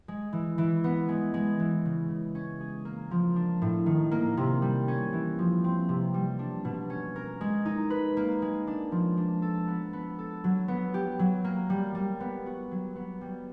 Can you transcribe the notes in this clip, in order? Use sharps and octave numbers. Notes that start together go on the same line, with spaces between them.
G#3
E3
E3
B3
G#3
G#3
E3
C#3
C#3
C#4
G#4
A#3
F3
D4
A2
D#3
A#3
C3
G3
C#4
E3
F3
C4
C3
G3
D4
B2
C#4
A#4
G#3
D#4
B4
A#3
G#3
D4
F3
D4
A4
B3
B3
A4
F#3
B3
G4
F#3
A#3
G3
G3
B3
F#4
F#3
B3
G3